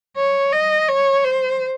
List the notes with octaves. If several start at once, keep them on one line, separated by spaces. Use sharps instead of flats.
C#5
D#5
C#5
C5